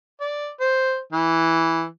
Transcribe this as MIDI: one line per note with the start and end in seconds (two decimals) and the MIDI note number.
0.21 0.49 74
0.60 0.98 72
1.13 1.84 52